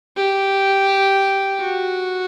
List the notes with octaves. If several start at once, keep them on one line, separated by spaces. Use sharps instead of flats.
G4
F#4